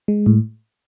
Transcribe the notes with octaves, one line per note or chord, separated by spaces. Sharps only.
G#3
A2